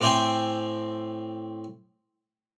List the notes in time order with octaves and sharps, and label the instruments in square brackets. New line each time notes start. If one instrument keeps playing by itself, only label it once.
[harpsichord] A2 C4 D5 E5 G5 G#5